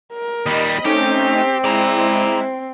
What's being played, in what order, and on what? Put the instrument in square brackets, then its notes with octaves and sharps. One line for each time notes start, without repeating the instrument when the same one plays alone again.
[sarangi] A#4
[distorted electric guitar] D#2 G3 [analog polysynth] D#5 B5 B6
[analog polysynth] A3 C#4 D#4 [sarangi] C4 [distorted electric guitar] G4
[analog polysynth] G#3 E4 [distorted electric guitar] D5 A#5